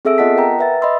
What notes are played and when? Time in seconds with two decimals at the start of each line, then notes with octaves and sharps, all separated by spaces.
0.05 C4 G#4 A4 E5 E6 D7
0.18 B3 F4 D#5 F#5 A5 B6
0.36 A#4 F#5 G5 A#5
0.59 B4 E5 A6
0.82 D#5 E5 B5 C6 E6